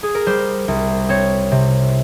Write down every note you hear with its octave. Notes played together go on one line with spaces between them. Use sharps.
G#4
A#4
G3 C5
C2
C4 C#5
C3